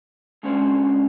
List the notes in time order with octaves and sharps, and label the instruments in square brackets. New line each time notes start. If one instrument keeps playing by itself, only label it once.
[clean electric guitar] G#3 C#4 D4 C5